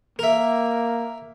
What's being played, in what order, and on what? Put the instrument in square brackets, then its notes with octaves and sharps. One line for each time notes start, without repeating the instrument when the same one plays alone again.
[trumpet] A#3 [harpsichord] A#4 E5